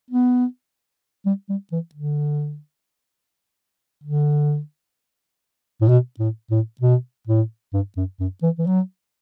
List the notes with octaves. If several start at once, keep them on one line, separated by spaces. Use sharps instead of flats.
B3
G3
G3
E3
D3
D3
A2
B2
A2
A2
B2
A2
G2
F#2
F#2
E3
E3
F#3